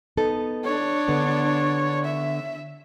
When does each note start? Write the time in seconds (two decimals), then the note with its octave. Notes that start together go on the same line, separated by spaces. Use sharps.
0.17 B3 D#4 A4
0.64 D4 C#5
1.08 D3 B3
2.05 E5